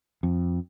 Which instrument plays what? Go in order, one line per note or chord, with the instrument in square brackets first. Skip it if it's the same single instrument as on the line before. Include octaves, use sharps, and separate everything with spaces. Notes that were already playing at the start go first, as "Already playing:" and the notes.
[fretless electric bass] F2